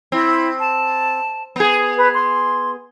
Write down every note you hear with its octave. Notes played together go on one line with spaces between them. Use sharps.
C4 E4
A5
B3 G#4
B4
C6